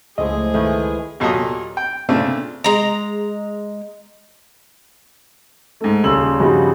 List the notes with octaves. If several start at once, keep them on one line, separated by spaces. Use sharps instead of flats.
C#2 A2 F3 G#3 G#4 D#5
D#3 E3 G#3 A3
D#2 A#2 F#3 A4 A#5 D#6
G5
A#2 C#3 A3 C4 D4 F4
G#3 A#5
G#2 A3
D#1 C#3 C6 E6 F#7
G2 C#3 F3 G3 D#4 F#4